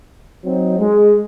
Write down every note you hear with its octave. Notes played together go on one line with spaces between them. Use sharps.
F#3 C4 D#4
G#3